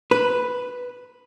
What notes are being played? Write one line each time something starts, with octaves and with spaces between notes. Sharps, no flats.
B4